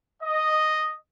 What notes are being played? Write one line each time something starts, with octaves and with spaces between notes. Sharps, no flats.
D#5